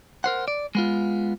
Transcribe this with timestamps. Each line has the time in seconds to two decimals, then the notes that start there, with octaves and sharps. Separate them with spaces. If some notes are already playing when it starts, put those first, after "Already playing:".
0.24 A#4 C5 F#5
0.48 D5
0.75 G#3 B3 F4